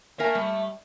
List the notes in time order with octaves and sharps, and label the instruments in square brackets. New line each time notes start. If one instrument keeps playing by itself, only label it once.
[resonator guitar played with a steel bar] A#3 A#4 G#5 [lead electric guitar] E5 A5
[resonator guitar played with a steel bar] G3